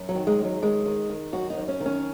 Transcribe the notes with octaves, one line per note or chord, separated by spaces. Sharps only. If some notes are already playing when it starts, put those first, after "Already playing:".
Already playing: F#2
F#3
D#3
G#3
F#2
F#3
D#3 G#3
D#3
D#3
F#2 F#4
D#4
F#2
C#4
D#3
C#4